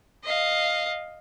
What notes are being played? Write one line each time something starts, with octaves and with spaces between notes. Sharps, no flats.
D#5 F5